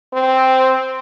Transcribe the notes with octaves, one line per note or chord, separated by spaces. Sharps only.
C4